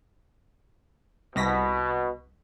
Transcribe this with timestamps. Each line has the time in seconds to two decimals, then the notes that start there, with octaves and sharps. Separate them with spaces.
1.36 C2 B2 A#6 B6